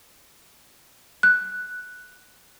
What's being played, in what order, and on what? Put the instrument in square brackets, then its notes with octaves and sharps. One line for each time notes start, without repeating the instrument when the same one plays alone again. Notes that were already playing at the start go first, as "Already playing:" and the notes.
[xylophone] F#6